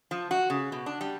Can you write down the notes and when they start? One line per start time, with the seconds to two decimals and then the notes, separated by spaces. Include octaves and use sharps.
0.11 F3
0.31 F#4
0.50 C#3
0.72 B2
0.86 D4
1.01 G3